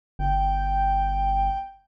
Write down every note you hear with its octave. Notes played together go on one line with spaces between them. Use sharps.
G1 G5